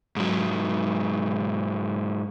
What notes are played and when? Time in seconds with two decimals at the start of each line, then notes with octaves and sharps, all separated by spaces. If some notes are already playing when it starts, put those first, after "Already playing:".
0.16 G#2 F#3